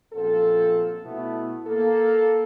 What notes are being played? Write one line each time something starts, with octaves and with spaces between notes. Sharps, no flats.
A#1 F#2 C4 F4 A4
B2 A3 B3 E4
A#3 A4